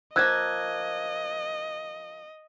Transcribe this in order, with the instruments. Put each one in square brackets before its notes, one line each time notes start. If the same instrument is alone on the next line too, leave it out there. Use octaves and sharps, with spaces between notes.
[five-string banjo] F3 A#3 [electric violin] D#5 [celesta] E6 F#6 G#6